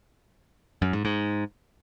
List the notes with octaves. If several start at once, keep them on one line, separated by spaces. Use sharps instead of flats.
F#2
G#2
G#2